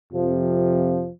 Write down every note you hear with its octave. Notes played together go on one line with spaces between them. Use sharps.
F2 C3 F3